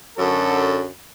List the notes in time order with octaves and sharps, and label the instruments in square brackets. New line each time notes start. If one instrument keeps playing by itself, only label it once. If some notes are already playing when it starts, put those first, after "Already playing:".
[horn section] F#2 D3 F#3 A4